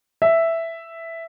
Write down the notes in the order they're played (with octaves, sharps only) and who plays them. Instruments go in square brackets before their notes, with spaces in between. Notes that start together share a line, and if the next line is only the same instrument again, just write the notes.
[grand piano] E5